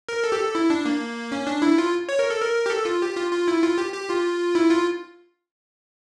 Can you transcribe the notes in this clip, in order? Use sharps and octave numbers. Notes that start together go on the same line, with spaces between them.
A#4
A4
G4
A4
E4
D4
A#3
C#4
D4
E4
F4
C#5
A#4
A4
A#4
G4
A4
F4
G4
F4
F4
E4
F4
G4
G4
F4
E4
F4